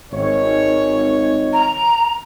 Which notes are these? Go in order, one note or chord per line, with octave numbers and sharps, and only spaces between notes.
G#1 D#3 C#5
A#5